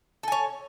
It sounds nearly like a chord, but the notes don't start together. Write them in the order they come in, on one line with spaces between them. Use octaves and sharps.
A4 G#5 C#5